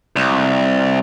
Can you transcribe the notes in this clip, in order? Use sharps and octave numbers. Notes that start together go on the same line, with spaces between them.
C2